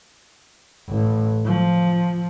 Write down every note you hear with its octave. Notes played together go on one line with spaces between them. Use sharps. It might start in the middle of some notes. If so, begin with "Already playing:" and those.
A1
F3